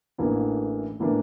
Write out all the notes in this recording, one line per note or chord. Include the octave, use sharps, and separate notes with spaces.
A1 A2 E3 A#3 D4
A2 E3 A#3 D4